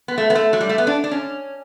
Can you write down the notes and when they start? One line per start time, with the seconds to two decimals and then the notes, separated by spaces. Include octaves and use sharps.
0.08 B3
0.18 A3
0.30 B3
0.35 A3
0.53 F#3
0.61 G3
0.69 A3
0.78 B3
0.87 D4
1.04 D4
1.12 C#4